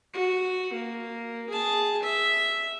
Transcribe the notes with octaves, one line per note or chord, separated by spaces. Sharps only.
F#4
A#3
G#4 A5
E5